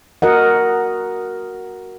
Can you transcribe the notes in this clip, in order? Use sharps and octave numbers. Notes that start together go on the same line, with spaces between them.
F#4 A#4 D#5 F#5